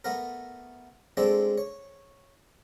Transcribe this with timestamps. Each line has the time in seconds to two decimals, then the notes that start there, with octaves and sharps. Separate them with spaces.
0.04 A3 B3 A#4
1.17 G#3 A3 C4 D4 A4
1.58 C#5